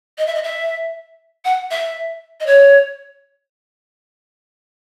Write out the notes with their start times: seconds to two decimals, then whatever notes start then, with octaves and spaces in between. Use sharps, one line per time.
0.18 D#5
0.27 E5
0.35 D#5
0.44 E5
1.45 F#5
1.71 E5
2.40 D#5
2.46 C#5